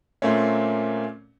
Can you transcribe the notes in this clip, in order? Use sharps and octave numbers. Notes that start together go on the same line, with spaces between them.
A#2 A3 A#3 C4 C#4